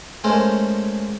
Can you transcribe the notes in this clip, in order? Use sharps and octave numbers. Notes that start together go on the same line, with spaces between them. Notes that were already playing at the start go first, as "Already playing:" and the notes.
G#3 A3 C#4 A#4 C5